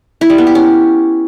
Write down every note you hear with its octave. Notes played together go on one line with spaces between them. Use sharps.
E4
G3
B3
G4
C#4